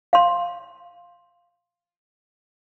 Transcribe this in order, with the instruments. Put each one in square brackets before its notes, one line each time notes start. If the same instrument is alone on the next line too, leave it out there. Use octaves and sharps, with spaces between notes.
[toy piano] F5 C6